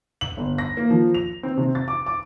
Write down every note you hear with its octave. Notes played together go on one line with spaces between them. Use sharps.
F#7
G1
A#6
A#3
F3
F7
C4
C3
A6
D6
D6